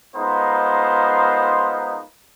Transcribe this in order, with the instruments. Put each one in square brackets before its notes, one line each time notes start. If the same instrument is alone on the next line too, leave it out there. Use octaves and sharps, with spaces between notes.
[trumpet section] G#3 B3 D#4 F4 A#4 C5